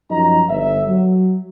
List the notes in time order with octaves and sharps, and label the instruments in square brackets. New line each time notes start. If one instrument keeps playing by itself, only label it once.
[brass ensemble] F#2 F3 D#4 D#5 A#5
G1 E5
F#3